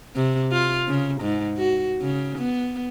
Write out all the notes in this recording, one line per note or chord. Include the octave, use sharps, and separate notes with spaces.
C3
F4
C#3
G#2
F#4
C#3
B3